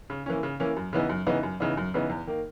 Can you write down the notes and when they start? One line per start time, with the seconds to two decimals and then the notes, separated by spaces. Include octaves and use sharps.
0.10 C#3
0.26 E3 A#3 C#4
0.43 C#3
0.60 E3 A#3 C#4
0.77 F#2
0.93 C#3 E3 B3 D#4
1.09 F#2
1.26 C#3 E3 B3 D#4
1.43 F#2
1.60 C#3 E3 B3 D#4
1.77 F#2
1.94 C#3 E3 B3 D#4
2.10 E2
2.27 D#3 A#3